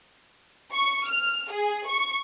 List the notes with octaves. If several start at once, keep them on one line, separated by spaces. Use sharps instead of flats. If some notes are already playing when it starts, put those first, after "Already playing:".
C#6
F6
G#4
C#6